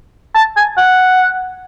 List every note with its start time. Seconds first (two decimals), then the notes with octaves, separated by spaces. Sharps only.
0.35 A5
0.57 G#5
0.77 F#5